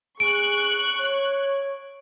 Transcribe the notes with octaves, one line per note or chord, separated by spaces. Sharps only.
G#4 C#6 F#6 D7
C#5